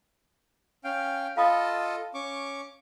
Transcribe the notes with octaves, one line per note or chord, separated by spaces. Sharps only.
C#4 F5 G5
F4 A4 D#5 F5 B5 D#6
C#4 C#6 D6